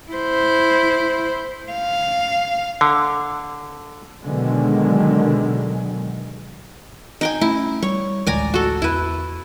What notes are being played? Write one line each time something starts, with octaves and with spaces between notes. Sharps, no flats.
E4 C5
F5
D3
B2 D3 D#3 F#3 G#3
D#4 G5 G#5
A3 C#4 E4
G3 C#5
A1 D2 G#3 D5 G#5 A#5
F#4 A4
E2 E4 B4